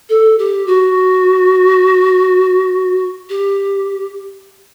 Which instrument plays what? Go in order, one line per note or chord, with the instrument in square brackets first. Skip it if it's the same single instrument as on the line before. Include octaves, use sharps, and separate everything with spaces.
[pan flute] A4
G4
F#4
G4